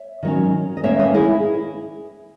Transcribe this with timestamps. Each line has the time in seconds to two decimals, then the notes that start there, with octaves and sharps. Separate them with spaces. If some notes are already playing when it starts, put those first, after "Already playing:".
Already playing: C#5 E5
0.23 D#3 F#3 C#4
0.77 D#5
0.83 D#3 A#3 C#4 C#5 E5
0.99 B4 D#5
1.14 E4 G#4